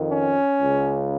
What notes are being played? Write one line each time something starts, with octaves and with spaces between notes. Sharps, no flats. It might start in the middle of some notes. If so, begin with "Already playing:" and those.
Already playing: F2 D#3
C#4
C#2 C#3